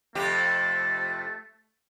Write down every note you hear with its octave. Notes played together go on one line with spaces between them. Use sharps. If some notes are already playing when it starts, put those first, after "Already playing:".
F2 C3 A3 G4